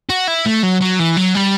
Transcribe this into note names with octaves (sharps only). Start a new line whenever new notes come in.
F#4
E4
A3
F#3
F#3
E3
F#3
G3